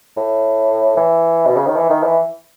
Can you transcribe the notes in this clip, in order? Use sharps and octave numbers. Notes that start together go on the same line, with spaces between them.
A2
E3
B2
C#3
D#3
E3
D#3
E3